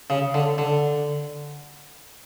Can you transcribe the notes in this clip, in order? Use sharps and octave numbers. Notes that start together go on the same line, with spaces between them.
C#3
D3
D3